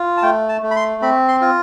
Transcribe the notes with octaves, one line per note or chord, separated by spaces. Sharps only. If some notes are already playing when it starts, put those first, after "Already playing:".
Already playing: F4
A5
A3 G5
A5
A3
B5
C6
C4 B5
C6
F4